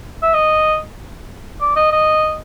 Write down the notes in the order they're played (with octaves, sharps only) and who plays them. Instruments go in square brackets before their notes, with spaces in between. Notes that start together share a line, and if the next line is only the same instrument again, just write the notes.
[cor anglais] E5
D#5
D5
D#5
D#5